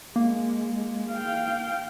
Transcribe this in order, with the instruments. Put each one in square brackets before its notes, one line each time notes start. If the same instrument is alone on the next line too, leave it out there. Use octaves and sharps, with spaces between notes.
[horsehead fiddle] G#3 [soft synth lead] A#3
[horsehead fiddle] F5 G5